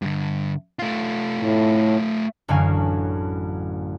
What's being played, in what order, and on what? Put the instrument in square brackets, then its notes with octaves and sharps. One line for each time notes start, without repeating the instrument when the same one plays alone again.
[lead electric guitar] G2 D3
A3 F4
[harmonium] A2
[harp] A1 F#2 D3 F#3 F5 G#5